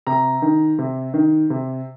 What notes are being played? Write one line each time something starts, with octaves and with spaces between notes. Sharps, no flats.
C3 A#5
D#3
C3
D#3
C3